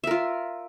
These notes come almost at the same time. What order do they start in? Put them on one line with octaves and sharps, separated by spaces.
E5 A#4 F4